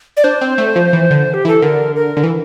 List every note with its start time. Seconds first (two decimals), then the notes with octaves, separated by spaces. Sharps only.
0.17 D5
0.24 D4 C5
0.41 C4
0.58 A3
0.76 F3
0.93 E3
1.10 D3
1.34 G4
1.45 E3 A4
1.62 D3 A#4
1.96 A#4
2.17 D3
2.23 E3